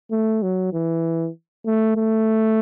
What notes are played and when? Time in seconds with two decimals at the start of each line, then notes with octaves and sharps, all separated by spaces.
0.11 A3
0.42 F#3
0.73 E3
1.66 A3
1.96 A3